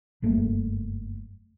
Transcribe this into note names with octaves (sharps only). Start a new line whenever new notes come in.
F#1 G2 A3 A#3